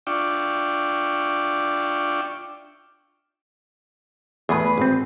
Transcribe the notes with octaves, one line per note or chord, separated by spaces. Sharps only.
D4 F4 D5 E5 G5 C#6
E2 A2 G#4 B4
G#1 C4